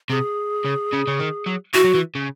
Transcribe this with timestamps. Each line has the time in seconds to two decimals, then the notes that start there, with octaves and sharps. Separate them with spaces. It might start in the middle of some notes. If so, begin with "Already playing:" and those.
0.10 C3 G#4
0.64 C#3
0.93 C#3
1.07 C#3
1.20 D#3
1.46 F#3
1.74 E3 F#4
1.84 F#3
1.94 E3
2.15 C#3